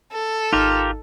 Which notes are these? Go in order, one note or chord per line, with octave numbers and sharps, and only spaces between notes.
A4
G#1 D#4 F4 G4 A#4